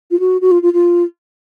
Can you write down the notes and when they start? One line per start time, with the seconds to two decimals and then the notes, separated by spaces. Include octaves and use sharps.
0.11 F4
0.20 F#4
0.41 F#4
0.51 F4
0.62 F4
0.73 F4